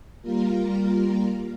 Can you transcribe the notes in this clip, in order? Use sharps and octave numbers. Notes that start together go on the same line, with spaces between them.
G3 A#3 F4 A#4